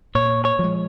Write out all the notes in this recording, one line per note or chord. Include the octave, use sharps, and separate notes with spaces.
A#2 C#5
C#5
F3 G#3